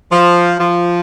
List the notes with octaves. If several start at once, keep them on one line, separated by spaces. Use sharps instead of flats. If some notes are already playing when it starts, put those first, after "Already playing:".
F3
F3